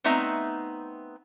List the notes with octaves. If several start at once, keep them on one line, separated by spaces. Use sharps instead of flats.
A3 B3 C4 D#4 E5 A#5